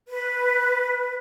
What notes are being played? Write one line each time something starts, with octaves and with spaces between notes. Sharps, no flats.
B4